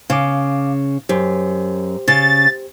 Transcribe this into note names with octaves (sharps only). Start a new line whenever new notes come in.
C#3 F5 D6
F#2 G4 C5
C#3 A6